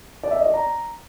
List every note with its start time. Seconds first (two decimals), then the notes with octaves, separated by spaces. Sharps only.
0.23 D5
0.31 E5
0.39 D#5
0.46 D5
0.54 A#5